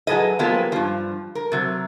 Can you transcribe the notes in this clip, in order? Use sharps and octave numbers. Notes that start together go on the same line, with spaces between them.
F#3 G#4 A4 B4 D#5
F3 F#3 G#3 A#3 B3 G4
G2 F3
A#4
C3 F#3